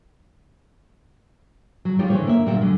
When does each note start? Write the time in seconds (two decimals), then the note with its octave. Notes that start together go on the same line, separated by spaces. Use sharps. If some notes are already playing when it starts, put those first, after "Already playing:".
1.85 F#3
1.99 G3 D#4 F4 G4 C#5
2.10 D3 E3 G4 C5 C#5
2.27 A#3 E5
2.46 D2 A#2 G3 A#3 F#4 E5
2.61 D3 F#3 G#3